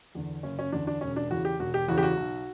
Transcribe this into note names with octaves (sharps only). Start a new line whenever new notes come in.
E2 D3
F#1 C#4
C#4
E2 D3 D4
D4
E1 C#4
D4
E2 C#3 E3 F#4
G4
E1 F#4
G4
E2 C#3 E3 F#4
G4
F#4
B1